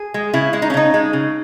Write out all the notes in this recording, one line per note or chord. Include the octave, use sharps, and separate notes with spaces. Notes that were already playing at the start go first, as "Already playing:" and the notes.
Already playing: G#4
G#3
C#3 E4
G#3 E4
D#4
C#4
C#3 D#4
G#3
C#3